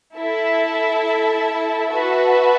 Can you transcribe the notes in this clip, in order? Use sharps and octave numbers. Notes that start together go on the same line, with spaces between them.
E4 A4 E5 A5
F#4 B4 E5 A5